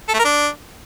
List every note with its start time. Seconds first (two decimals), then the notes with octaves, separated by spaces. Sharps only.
0.08 A4
0.14 A3
0.19 A#4
0.25 D4